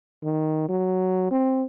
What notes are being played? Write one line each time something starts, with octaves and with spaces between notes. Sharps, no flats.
D#3
F#3
C4